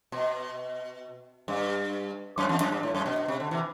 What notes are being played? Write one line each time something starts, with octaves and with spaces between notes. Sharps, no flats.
B2
G2
F#2
E2
F#2
G2
A2
F#2
B2
B2
C3
D3
C3 E3